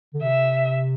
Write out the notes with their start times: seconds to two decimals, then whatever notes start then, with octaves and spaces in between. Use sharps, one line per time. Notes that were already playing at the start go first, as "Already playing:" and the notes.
0.14 D3
0.23 C3 E5